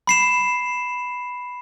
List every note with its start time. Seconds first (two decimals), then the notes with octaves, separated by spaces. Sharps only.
0.07 B5 C7 E7